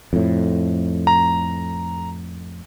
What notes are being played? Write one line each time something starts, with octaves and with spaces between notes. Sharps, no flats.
F2 A2
A#5